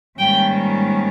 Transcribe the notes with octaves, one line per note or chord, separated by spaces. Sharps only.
G#2 D#3 G3 A#3 C#4 G5